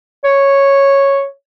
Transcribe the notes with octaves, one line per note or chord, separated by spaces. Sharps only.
C#5